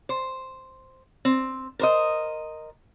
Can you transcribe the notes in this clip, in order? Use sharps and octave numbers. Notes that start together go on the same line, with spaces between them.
C5
C4
A#4 C5 D#5